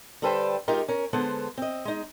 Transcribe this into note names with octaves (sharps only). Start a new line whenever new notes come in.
D3 G3 A4 B4 C5 G5
G#3 D#4 F4 G4 A#4
C#4 A#4
D3 G#3 B3 A4 C5
C4 D#5
G#3 D#4